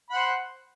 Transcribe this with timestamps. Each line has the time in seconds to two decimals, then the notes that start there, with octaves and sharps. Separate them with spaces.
0.10 B5
0.13 F#5
0.15 C5